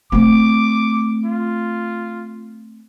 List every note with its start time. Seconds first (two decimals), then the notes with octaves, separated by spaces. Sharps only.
0.12 A3 C4 D6
1.25 F4